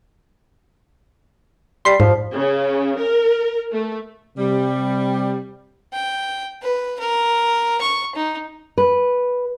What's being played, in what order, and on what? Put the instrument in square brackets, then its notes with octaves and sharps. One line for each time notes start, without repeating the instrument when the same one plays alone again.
[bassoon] G3 [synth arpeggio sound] C6 B6 C7
[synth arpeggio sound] G#2 [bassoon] F3
[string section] C#3
A#4
A3
[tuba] C3 [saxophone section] G3
[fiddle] G5
B4
A#4
C#6
D#4
[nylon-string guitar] B4